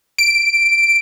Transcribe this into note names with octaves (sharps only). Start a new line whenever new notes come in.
D7